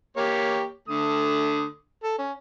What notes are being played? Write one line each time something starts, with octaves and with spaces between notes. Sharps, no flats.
A#3 G4 C#5
D3 A3 D#6
A4
C#4